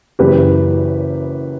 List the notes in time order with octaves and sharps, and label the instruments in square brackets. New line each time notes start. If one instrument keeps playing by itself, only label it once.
[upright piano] F#1 F#2 E3 G4 B4